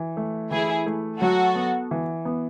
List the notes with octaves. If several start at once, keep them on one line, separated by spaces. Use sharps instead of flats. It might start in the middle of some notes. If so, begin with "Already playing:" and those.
Already playing: E3
A3
E3 E4 G#4
A3
F#3 F#4 A4
B3
E3
B3